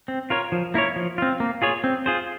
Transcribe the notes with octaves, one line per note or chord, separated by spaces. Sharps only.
C4
F4 A#4 C#5
F3
A#3 E4 A#4 C#5
F3
C4 F4
A#3
F4 G#4 C#5
C4
F4 G#4 C5